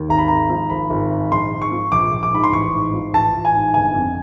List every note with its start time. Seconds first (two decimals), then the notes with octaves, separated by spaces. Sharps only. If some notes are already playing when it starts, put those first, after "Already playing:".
Already playing: D#2
0.09 G#1 A#5
0.18 B5
0.28 G#2 A#5
0.50 F3
0.70 G#1 B5
0.90 G#1
1.10 G#2
1.32 A#1 C6
1.52 G#2
1.61 C#6
1.72 F3
1.92 A#1 D6
2.12 A#1
2.23 D6
2.32 G#2 B5
2.44 C6
2.52 A1 C#6
2.74 G#2
2.94 F3
3.13 A1 A5
3.34 A1
3.45 G#5
3.55 G#2
3.74 G1 G#5
3.95 F2